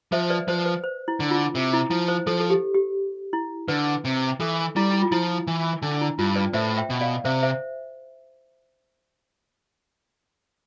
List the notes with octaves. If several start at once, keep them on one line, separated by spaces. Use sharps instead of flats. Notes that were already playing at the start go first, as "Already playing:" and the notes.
F3 C5 E5
B4 D5
F3 C5
B4
C5
E4
D3
F4
C3
E4
F3 E4
C5
F3 A4
A4
G4
G4
E4
D3 B4
C3
E3 A4
G3 E4
E4
F4
F3 E4
E3
D3 D4
E4
G2 F4
B4 D5
A2 C5 E5
E5 G5
B2
D5 F5
C3 C5 E5
C5 E5